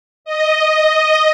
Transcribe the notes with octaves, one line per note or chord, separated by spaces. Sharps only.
D#5
D#5